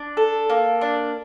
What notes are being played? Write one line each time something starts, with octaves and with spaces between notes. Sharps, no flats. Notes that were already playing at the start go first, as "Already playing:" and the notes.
Already playing: D4
A4
A#3
D4